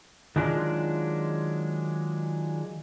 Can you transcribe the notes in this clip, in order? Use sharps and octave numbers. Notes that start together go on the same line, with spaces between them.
D#3 F#3 G#3 D4 F4